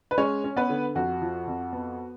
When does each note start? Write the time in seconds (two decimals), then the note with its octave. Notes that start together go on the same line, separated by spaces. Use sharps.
0.11 B4
0.18 G#3 C#4 C#5
0.44 C#4
0.57 B3 B4
0.69 D3
0.95 F2 F#4
1.22 F3
1.47 F2
1.73 B3